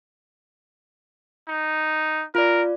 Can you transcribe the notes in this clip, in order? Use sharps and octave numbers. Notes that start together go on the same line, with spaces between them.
D#4
F4 A#4 D5